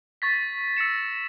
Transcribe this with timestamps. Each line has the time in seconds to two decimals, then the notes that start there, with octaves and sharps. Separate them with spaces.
0.22 C#6 A6 B6
0.77 E6 A#6 C#7 E7